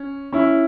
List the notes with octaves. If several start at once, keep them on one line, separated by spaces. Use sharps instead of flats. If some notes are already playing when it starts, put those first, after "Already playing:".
Already playing: C#4
C#4 E4